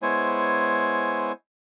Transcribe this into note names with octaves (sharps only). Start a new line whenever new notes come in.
G#3 B3 E4 C5 C#5 G#5